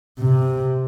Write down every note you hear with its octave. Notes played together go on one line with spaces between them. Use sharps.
C3